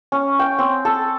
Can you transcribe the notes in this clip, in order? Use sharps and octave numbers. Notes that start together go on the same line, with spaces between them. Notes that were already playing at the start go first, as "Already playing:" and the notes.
C#4
G5
C4
A4